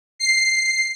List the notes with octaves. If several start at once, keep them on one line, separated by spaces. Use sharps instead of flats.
C7